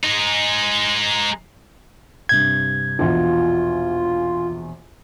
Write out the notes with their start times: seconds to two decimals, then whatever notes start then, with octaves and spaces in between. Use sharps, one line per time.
0.04 G#3 D#4
2.29 G2 C3 G6 G#6
2.99 A#1 E2 B2 F4